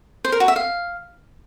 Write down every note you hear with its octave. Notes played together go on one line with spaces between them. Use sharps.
C5
A#4
F#4
E5
F5